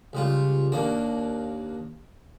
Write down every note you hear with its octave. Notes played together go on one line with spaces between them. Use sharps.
C#2 G3 F4
D#2 A#3 D4